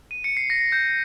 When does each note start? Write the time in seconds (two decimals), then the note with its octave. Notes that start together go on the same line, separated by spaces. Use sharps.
0.11 D#7
0.24 C#7
0.37 C7
0.50 A#6
0.72 G6